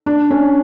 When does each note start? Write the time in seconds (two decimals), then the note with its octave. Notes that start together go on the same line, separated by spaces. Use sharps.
0.06 D4
0.31 C#4